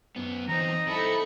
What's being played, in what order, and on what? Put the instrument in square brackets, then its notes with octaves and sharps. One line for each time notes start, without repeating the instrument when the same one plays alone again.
[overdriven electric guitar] F#2 B3
[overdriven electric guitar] E2 C4 [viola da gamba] D#4 [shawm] A#5
[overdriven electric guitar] C4 E4 [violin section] A4 B5 C#7